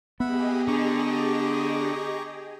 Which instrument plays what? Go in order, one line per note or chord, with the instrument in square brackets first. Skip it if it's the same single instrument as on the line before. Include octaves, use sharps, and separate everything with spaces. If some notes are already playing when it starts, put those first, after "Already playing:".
[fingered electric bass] B3 [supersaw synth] G4 G#4 D#5 [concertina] E5 F#5 B5
[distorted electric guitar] D3 [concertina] A#5 C#6 D6